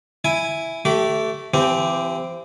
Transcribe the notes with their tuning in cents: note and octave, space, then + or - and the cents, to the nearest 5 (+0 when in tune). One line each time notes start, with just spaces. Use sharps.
E4 +0 G#5 +0
A3 +0 G4 -30 B5 +25
E3 +30 C4 -15 G4 +0